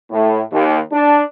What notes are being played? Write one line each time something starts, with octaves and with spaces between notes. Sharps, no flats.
A2
D#2
D4